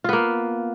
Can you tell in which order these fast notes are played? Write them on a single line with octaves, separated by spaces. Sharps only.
F4 B3 A#3